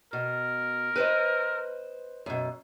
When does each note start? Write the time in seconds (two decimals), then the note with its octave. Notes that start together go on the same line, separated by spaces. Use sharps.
0.13 B2 A#4
0.96 B4 C5 D#5
2.26 F#2 B2